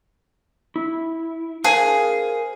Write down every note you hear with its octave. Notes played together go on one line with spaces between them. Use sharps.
E4
G#4 A#4 C5 F5